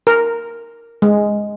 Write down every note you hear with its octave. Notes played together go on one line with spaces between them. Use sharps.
A#4
G#3